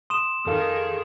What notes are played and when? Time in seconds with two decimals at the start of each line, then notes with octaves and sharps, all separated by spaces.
0.10 C6 D#6 E7
0.46 F2 D#3 G#4 A4 F5